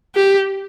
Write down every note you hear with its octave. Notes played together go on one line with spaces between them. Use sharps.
G4